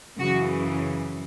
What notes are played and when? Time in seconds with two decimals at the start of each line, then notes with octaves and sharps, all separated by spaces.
0.19 F#2 C#3 E3 F#4